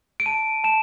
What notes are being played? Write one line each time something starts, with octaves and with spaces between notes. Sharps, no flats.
D7
A5 D#7
A5 E7